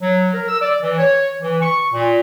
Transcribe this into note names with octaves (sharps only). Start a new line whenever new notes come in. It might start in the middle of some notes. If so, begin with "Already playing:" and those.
F#3
A#4
E6
D5
E3
C#5
E3
C#6
A#2